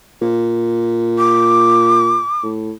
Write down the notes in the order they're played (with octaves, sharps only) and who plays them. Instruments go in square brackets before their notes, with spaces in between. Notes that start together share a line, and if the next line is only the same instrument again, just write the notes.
[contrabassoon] A#2
[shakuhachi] D6
[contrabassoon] A2